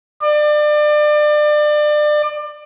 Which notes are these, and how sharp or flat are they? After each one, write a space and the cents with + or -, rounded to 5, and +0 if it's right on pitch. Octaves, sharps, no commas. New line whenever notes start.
D5 +30